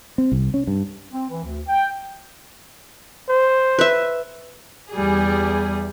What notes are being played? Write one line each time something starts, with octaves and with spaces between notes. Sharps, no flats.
C4
C2
C#4
G2
C4
E3
D2
G5
C5
B4 E5
E2 G3 G#4